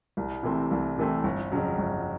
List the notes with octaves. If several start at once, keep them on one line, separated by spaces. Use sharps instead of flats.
C2
C3 E3 A3 C4
C2
C3 E3 A3 C4
G1
F2 C#3 F#3
G1